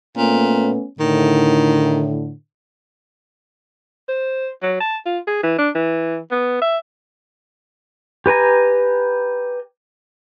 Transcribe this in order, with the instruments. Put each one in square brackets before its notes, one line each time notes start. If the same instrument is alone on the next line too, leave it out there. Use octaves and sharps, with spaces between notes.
[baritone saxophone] A#2 [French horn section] A3 B3 C#4
[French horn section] A2 D3 [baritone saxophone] D#3
[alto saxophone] C5
F#3
A5
F4
G#4
E3
D4
E3
B3
E5
[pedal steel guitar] G4 B4 G#5 A#5